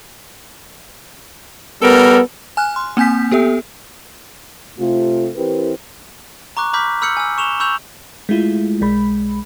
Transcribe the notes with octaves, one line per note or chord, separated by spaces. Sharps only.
G3 B3 A4 A#4
G#5 F6 F#6
C6
A#3 C4 G#5 G6 B6
B3 G4 A4 E5
C3 A3 F4
E3 C4 E4 G4 A#4 B4
A#5 C#6 D6 F#6
A#5 B5 D6 F6 G6 B6
B5 E6 F6 G6 C#7 F#7
G#5 E6
C#6 E7 F7 G7
B5 C#6 E6 G6 F7 F#7
G#3 A3 E4 F4
B1 G#3 B5